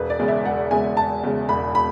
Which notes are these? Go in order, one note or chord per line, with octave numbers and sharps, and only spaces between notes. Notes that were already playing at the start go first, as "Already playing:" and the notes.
Already playing: E1 B4
D5
E2 C#3 G#3
E5
E1 F#5
E2 C#3 G#3 G#5
E1 A5
E2 C#3 G#3
E1 B5
B5